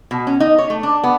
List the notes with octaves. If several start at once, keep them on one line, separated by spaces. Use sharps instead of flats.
B2
C#4
D#4
C#5
A3
D4
B3